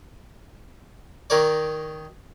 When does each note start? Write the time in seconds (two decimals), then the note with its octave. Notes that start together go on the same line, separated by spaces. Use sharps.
1.30 D#3 A#4 C#5 D5